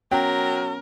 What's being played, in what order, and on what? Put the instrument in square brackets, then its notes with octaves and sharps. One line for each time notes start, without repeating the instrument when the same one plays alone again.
[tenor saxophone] F#3 [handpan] B3 C#4 [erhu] A#4 [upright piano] G5